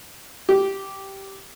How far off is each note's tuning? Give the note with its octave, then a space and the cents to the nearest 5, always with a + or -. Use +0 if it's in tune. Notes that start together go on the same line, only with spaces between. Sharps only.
G4 -10